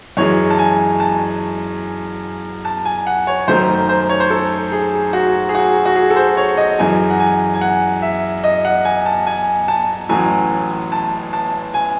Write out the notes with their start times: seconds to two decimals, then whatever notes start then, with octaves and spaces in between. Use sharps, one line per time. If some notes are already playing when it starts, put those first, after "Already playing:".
0.17 F#2 E3 G#3 C#5
0.50 A5
0.59 G#5
1.00 A5
2.65 A5
2.85 G#5
3.07 F#5
3.27 C#5
3.48 F#2 D#3 A3 C5
3.89 C5
4.09 C#5
4.20 C5
4.30 A4
4.72 G#4
5.13 F#4
5.49 G#4
5.55 F#4
5.86 F#4
5.96 G#4
6.10 A4
6.16 C5
6.37 C#5
6.57 D#5
6.79 F#2 E3 G#3 G#5
7.10 F#5
7.20 G#5
7.54 G#5
7.61 F#5
8.02 E5
8.44 D#5
8.65 F#5
8.85 G#5
9.06 A5
9.27 G#5
9.68 A5
10.09 A1 A2 F#3 G#5
10.92 A5
11.33 A5
11.74 G#5